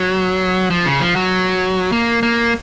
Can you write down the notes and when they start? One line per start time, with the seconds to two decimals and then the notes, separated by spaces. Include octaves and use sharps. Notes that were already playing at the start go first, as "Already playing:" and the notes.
Already playing: F#3
0.70 F3
0.85 C#3
1.00 F3
1.16 F#3
1.92 A#3
2.23 A#3